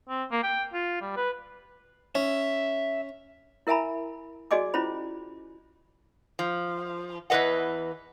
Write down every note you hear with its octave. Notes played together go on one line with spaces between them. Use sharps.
C4
A#3
G5
F4
G3
B4
C#4 E5
E4 A#4 E5 G#5 A#5 B5
F#4 G#4 D5 D#5 G#5 D6
C#4 E4 F4 C5 B5
F3
E2 E3 F3 B4 D#5 F#5